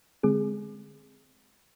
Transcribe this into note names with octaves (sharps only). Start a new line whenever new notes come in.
D3 G#3 C4 G#4